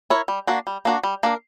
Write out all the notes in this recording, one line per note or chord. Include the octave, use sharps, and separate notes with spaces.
E4 A#4 C#5
G3
A#3 D4 F#4
G3
A#3 D4 F#4
G3
A#3 D4 A#4